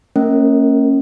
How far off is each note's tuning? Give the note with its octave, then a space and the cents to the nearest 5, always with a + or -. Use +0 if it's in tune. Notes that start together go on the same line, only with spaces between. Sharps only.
A#3 -40 C#4 -15 A#4 +0